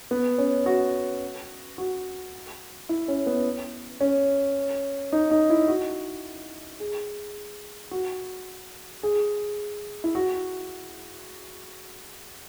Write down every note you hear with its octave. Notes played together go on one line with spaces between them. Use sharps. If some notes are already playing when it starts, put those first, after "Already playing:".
B3
C#4
F#4
F#4
E4
C#4
B3
C#4
D#4
D#4
E4
F#4
G#4
F#4
G#4
E4
F#4